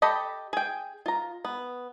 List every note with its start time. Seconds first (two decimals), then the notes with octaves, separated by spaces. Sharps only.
0.02 G4 A4 D#5 B5
0.53 G#4 G5
1.06 F4 A#5
1.45 B3